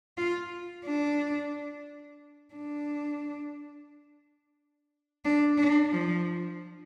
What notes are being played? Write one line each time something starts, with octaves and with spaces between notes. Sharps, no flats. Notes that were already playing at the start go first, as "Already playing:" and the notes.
F4
D4
D4
D4
D4
F3